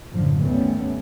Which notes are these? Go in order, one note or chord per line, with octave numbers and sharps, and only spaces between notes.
F#1 F#2 A2 D3 F3
G#1 D#2 G3 A3 B3 C#4